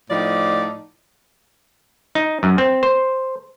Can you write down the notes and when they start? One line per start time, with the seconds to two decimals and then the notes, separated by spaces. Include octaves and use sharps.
0.11 A2 F3 D#4 D5
2.15 D#4
2.43 F#2
2.58 C4
2.83 C5